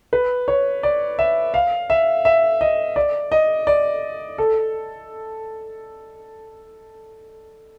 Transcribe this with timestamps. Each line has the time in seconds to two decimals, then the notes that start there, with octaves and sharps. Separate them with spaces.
0.13 B4
0.48 C#5
0.83 D5
1.19 E5
1.54 F5
1.90 E5
2.25 E5
2.61 D#5
2.96 D5
3.32 D#5
3.67 D5
4.38 A4